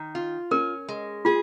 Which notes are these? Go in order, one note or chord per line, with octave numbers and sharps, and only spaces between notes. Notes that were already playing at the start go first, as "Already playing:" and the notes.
Already playing: D#3
F4
C#4 A#4
G#3
F4 G#4